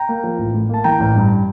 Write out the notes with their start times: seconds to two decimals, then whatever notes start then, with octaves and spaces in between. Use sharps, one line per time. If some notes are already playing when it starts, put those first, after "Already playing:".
Already playing: G5 A#5
0.09 A#3
0.24 F3
0.39 A1
0.54 A2
0.69 A#3 A5
0.84 E3 G5 A#5
1.00 A1
1.15 G2